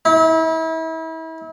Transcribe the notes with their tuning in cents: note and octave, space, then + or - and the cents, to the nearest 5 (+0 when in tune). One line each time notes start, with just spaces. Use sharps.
E4 -35